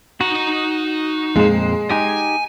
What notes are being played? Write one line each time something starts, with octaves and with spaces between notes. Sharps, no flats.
D#4 F#4 A#5
F2 A#2 G#3 C5
D#4 G4 G#5